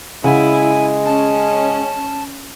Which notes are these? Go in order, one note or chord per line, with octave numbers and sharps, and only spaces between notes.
C#3 G#3 E4 F#5 G#5
C#4 A5